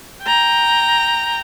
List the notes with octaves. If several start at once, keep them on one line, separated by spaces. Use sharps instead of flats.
G5 A#5